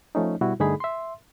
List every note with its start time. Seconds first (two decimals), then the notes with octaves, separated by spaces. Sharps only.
0.15 F3 A3 C#4 D#4
0.41 B2 G3 E4 F#4
0.60 G2 D3 A3 D#4 G#4 B5
0.80 E5 C6